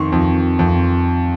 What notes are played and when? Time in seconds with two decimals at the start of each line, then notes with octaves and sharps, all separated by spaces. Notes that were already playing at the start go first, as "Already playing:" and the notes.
Already playing: F2 D#3 C6 C#6
0.12 F2
0.59 F2